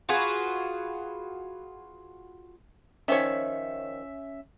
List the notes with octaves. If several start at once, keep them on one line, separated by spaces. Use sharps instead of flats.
F4 F#4 G#4 B4
D#3 F3 C#4 C#5 E5